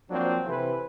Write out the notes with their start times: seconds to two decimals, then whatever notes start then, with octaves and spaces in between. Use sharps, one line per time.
0.10 F3 F#3 A#3 C4 D4
0.46 C3 E3 A4 B4 C5